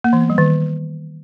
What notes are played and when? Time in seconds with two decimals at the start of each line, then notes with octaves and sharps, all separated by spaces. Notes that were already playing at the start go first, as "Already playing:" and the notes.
0.04 A#3
0.13 E3
0.21 B3
0.30 G3
0.38 D#3